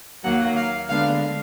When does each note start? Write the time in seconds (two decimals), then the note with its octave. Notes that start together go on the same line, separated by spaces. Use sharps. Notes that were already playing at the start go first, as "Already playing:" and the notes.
0.24 D#2 D#3 F#3 A#3 F#5
0.56 F5
0.89 D3 G#3 B3 D4 F5